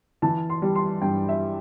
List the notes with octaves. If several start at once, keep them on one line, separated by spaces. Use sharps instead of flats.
E3 A5
C6
G3
C6
G2 G5
E5